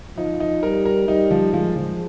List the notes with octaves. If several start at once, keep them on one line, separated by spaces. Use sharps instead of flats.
F3 D#4
D#4
G3 A#4
A#4
G3 D#4
F3
F3 G#3
F3